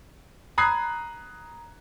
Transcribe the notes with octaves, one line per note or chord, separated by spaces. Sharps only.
A#5 B5 D#6 F#6 G#6 C7